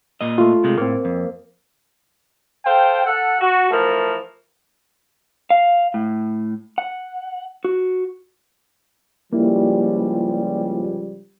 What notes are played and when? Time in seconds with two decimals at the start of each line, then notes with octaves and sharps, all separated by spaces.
0.21 A#2 A#3 D#5
0.38 A3 F4
0.64 C3 G#3
0.78 A2 A#3 C4
1.05 F2
2.64 A4 C5 F5 G5
3.05 A4 F#5
3.39 F#4
3.70 E3 F3 A3 A#4
5.50 F5
5.94 A2
6.78 F#5
7.64 F#4
9.33 C#2 F3 G3 A#3 E4